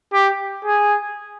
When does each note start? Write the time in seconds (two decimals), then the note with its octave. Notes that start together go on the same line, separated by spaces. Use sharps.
0.13 G4
0.65 G#4